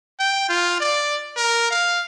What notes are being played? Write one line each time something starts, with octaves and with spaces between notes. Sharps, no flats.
G5
F4
D5
A#4
F5